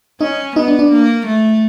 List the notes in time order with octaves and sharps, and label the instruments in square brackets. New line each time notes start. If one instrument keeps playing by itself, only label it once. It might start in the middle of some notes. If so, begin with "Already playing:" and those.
[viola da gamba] C#4 [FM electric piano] D#4
[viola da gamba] B3 [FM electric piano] D#4
[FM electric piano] D4
D4
[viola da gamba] A#3
A3